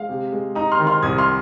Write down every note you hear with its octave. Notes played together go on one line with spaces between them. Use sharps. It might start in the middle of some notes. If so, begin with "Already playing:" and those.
Already playing: G#3 F5
C3
G#3
D#4 A#5 D#6
C6 F6
D#3
C6 F6
C2 D#6 G#6
C6 F6